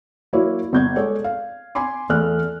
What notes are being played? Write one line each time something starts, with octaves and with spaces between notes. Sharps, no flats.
F#3 A#3 E4 C#5 D5
G1 G6 G#6
G#3 A4 C#5 D5
F5
G#5 B5 C6 D6
E2 A3 A4 D5 F6 F#6